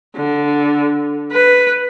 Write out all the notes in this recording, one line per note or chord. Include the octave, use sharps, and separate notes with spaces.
D3
B4